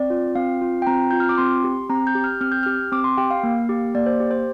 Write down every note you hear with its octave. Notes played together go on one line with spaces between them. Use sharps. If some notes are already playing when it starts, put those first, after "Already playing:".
Already playing: C4 D5
F4
C4 F5
F4
G5
C4 A#5
F4 G6
F6
D6
C4 C6
G4
C4 A#5
G6
G4
F6
C4 F6
G6
G4 F6
C4 D6
C6
G4 G5
F5
A#3
G4
A#3 D5
C5
G4
C5